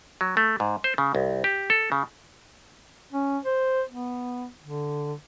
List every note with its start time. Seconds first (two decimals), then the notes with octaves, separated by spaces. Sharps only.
0.21 F#3
0.37 A3
0.60 G#2
0.84 C5
0.98 C#3
1.15 C2
1.44 G4
1.70 A4
1.92 C#3
3.13 C#4
3.45 C5
3.89 B3
4.64 D3